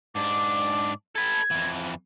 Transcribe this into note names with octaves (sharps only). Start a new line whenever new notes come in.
G#2 D4 D6
A4 B4 G#6
F2 E3